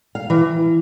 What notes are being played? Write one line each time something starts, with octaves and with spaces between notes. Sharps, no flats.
F5
E3